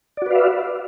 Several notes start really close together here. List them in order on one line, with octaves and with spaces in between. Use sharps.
D5 F#4 B4 F5 E5